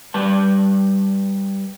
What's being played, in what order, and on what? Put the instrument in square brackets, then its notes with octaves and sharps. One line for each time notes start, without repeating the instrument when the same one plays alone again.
[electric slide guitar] G3 B4 A5